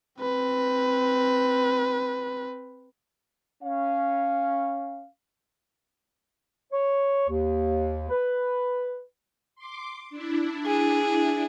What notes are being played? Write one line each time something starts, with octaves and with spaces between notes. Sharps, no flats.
C4 B4
C#4 F5
C#5
D#2
B4
C6 D6
D4 E4
G#4